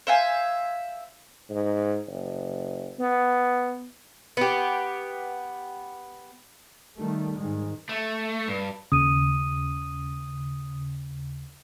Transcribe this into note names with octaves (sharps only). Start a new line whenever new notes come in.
C5 E5 F5 G#5
G#2
F#1
B3
B3 G4
D#3 G3 A3
G#2 D#3 G#3
A3
G2
D#2 C#3 D#6 D#7